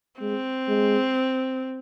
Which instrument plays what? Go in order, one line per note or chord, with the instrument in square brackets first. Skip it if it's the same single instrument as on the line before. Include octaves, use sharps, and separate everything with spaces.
[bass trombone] G#3 [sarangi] C4
[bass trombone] G#3